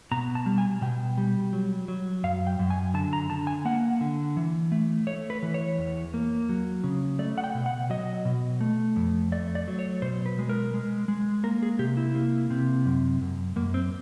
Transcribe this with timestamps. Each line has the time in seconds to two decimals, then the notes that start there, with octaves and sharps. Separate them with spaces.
0.11 B2 A#5
0.35 A5
0.46 G3
0.58 G#5
0.82 B2 G5
1.18 G3
1.53 F#3
1.88 F#3
2.24 F#2 F5
2.47 G5
2.59 F#2
2.70 G#5
2.94 D3 A5
3.13 A#5
3.30 D3 A5
3.47 G#5
3.65 A#3 F#5
4.01 D3
4.37 E3
4.72 A3
5.07 A3 C#5
5.30 B4
5.43 E3
5.54 C#5
5.78 E2
6.14 A#3
6.49 F#3
6.84 C#3
7.19 A3 D5
7.38 F#5
7.44 G5
7.55 B2
7.66 F#5
7.90 F#3 D#5
8.25 B2
8.61 A3
8.96 F2
9.32 A3 D5
9.55 D5
9.68 F#3
9.79 C#5
10.02 B2 C5
10.26 B4
10.39 G#3
10.49 A#4
10.74 G#3
11.08 G#3
11.44 A#3 A#4
11.63 G#4
11.79 C3 G4
11.97 E4
12.15 A#3
12.50 C3
12.86 F#2
13.22 F#2
13.56 F#2 A#3
13.74 C4